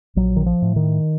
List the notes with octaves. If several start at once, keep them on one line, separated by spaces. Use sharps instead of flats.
A#1 F#3
D#3
F3
A2
D#3